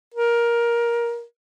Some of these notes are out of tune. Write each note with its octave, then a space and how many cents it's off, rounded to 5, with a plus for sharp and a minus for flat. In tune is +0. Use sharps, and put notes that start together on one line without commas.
A#4 +15